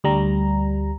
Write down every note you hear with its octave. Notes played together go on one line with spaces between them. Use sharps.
D2 G3 A#5